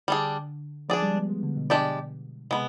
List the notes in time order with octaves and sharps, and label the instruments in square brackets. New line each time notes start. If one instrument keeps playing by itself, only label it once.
[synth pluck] D3 [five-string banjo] G3 D4 G#4
[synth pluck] F3 [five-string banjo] D4 G#4 D5
[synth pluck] G3
G#3
B3
G#3
D3
B2
[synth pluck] B2 [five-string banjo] G#3 D4 G4 D5
[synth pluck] C3 [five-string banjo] G#3 B3